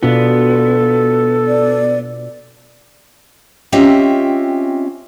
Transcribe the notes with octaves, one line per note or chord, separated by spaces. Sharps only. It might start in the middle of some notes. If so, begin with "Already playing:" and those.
B2 B3 D4 F4 A4
D5
C4 C#4 F4 G4 D#5 E5